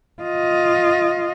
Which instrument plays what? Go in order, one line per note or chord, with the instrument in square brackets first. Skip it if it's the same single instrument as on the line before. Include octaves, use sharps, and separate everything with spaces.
[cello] F4 D#5